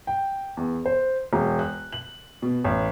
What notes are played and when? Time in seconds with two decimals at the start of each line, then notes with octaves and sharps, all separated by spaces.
0.07 G5
0.57 E2
0.86 C5
1.33 E1
1.59 F#6
1.93 F#7
2.42 B2
2.64 A1